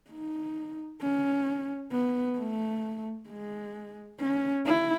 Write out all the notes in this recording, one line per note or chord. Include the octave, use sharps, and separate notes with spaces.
D#4
C#4
B3
A3
G#3
C#4
E4